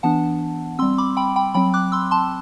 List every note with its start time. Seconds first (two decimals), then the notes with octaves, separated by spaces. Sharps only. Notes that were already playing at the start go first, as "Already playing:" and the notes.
0.03 E3 B3 D4 F#5 A5
0.79 G3 C4 C6 E6
0.98 B5 D6
1.17 G5 B5
1.36 G5 B5
1.54 F#3 C4 G5 B5
1.74 D6 F#6
1.92 C6 E6
2.11 A5 C6